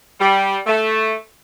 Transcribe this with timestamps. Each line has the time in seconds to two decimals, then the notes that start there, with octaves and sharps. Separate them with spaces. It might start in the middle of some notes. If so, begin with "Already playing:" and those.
0.21 G3
0.66 A3